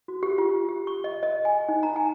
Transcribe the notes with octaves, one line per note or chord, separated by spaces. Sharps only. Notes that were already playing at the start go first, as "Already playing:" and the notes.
F#4
G4
F4
G4
C#6
D#5
D#5
G#5
D#4
A#5
G#5